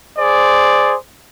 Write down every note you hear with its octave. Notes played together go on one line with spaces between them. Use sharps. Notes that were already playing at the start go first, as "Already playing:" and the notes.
G#4 C5 D5